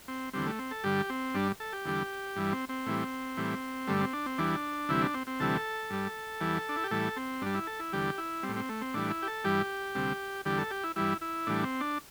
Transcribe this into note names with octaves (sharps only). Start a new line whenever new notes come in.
C4
E2 D3 G3 C4
A3
C4
A4
G2 D3 G3 G4
C4
G2 G3 D4
A4
G4
E2 D3 G3
G2 E3 G3
C4
C4
A2 E3 G3
A2 E3 G3
G2 D3 G3 A3
C4
D4
C4
E2 E3 G3 D4
D2 C3 E3 G3 E4
D4
C4
C4
D2 C3 E3 G3 A4
G2 G3
E2 E3 G3
D4
E4
G4
A2 E3 G3 A4
C4
G2 G3 D4
E4
A4
E4
E2 D3 G3 G4
E4
G3 C4
A2
C4
A3
C4
A2 E3 G3 D4
E4
G4
A4
G2 E3 G3 G4
D2 C3 G3
E2 D3 G3 G4
A4
G4
E4
G2 E3 G3 E4
E4
A2 E3 G3 D4
C4
D4